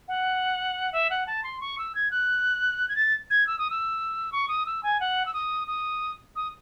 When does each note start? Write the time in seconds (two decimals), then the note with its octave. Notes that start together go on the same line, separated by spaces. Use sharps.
0.08 F#5
0.93 E5
1.10 F#5
1.27 A5
1.44 C6
1.61 C#6
1.78 E6
1.95 G#6
2.11 F#6
2.89 G#6
2.96 A6
3.30 G#6
3.47 E6
3.59 D#6
3.70 E6
4.32 C#6
4.48 D#6
4.66 E6
4.83 G#5
5.00 F#5
5.26 E6
5.34 D#6
5.67 D#6
6.36 D#6